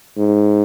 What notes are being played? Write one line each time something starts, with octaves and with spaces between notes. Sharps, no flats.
G#2